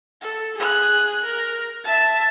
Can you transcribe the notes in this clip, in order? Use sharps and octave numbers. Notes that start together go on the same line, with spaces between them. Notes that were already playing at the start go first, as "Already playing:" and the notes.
A4
G#4 F#6
A#4
E5 A5